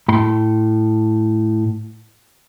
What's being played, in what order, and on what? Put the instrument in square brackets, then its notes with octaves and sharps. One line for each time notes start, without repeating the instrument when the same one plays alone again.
[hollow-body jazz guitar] A2 B5 C6